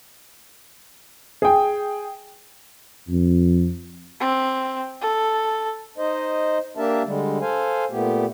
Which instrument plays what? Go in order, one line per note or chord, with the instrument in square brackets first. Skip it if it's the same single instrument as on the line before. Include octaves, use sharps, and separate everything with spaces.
[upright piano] G#4 G5
[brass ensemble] F2
[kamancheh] C4
A4
[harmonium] D#4 C5 D#5
A#3 D4 G4 A#4 E5 A5
D3 G3 G#3
A4 C5 F5 G#5
A#2 A3 B3 G4